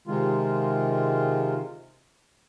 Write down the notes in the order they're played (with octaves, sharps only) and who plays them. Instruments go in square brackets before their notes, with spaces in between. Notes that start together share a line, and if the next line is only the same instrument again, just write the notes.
[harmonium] C3 D#3 G#3 F4